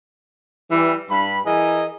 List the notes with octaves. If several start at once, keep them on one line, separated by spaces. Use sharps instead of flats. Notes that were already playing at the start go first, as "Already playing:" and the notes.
E3 G3
G2 B5
E3 G#4 A#4 D#5 G#5